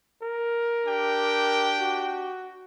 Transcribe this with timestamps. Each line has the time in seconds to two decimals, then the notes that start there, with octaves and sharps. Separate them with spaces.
0.22 A#4
0.86 D4 G4 G5
1.80 F#4